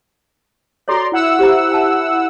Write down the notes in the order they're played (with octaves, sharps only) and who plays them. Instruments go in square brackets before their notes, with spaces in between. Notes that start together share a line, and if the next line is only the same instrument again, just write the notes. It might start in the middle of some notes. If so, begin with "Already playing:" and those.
[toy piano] F#4 A4 C#5 [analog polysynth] D5 A#5 C6
[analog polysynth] E4 F#5 E6
[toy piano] G4 C5 A#5
G5 A5